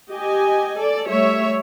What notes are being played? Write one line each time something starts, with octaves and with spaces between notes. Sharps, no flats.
G4 D#5 G#5
A4 D5
G3 A3 C#5 E5